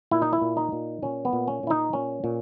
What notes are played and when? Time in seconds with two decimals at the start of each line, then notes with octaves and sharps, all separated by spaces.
0.11 A#2 E4
0.22 D#4
0.33 E4
0.42 A#2
0.57 D#4
0.72 A#2
1.02 A#2 C#4
1.25 B3
1.33 A#2
1.48 C#4
1.63 A#2 E4
1.70 D#4
1.93 A#2 C#4
2.24 A#2